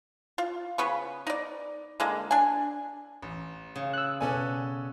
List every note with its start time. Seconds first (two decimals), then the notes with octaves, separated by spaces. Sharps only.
0.38 F4
0.78 C#3 B3 C#6
1.27 D#4 D5
2.00 D3 G#3 A#3
2.31 D4 G#5
3.22 A1
3.76 C#3
3.93 E6 F#6
4.21 B2 B3 C#4 A4 D5 G#5